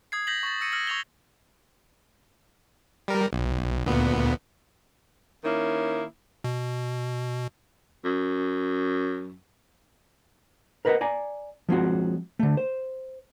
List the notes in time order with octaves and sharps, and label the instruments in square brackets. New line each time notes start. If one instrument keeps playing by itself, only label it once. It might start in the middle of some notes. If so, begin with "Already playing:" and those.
[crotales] D#6 G#6 C7
G6 A#6 B6 F#7
C#6 A6
E6 A#6 C#7 D#7
E6 F6 A#6 C#7 F#7
C#6 G#6 F7 G7
[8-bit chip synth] G3 A#4
B1
D2 A#2 B3
[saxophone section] D#3 A#3 C#4 E4
[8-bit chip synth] B2
[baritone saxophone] F#2
[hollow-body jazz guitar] A#4 B4 D#5 F5 F#5
D5 G#5 A#5
F3 G#3 C4 F#4
D3 A3
C5